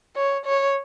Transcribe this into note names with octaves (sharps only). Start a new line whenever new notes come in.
C#5
C#5